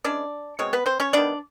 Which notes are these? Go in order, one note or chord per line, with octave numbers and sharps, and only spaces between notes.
E3 G#3 C#4 D4 D5
B2 G#3 C4 C#5
B3 B4
C4 C5
C#4 C#5
D#3 G3 B3 D4 D5